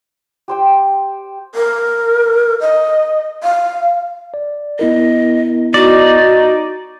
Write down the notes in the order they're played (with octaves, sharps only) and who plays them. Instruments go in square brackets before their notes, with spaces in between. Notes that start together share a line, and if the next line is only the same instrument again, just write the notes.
[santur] G4 C5 G5
[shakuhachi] A#4
D#5
F5
[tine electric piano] D5
[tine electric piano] B3 E4 A#4 [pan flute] D#5
[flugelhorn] D#4 [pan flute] F#4 [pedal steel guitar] D5